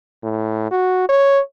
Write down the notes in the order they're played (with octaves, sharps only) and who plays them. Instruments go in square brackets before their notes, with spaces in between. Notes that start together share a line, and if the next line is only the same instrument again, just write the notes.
[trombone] A2
F#4
C#5